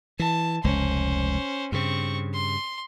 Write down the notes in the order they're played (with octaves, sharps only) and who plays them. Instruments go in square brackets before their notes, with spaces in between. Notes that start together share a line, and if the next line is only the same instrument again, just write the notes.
[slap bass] E3 [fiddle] A5
[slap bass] F1 C#2 G#3 [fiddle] C#4 C5
[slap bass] G2 C#3 [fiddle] C4 C#6
[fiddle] C6